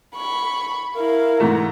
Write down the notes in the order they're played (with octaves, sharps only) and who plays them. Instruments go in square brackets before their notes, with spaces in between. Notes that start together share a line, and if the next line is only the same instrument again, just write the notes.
[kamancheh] B5 C#6
[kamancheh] E4 F5 [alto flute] A#4
[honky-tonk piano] G#2 E3 A3 [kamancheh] A#5